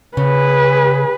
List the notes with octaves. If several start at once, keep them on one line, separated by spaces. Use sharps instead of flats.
C#3 G#4 B4